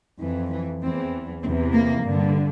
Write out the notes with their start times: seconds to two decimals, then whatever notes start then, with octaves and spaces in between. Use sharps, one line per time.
0.21 F2 E3
0.52 E3
0.82 E2 E3 C4
1.43 E2 C3 E3 C4
1.73 A#3
2.03 G2 D3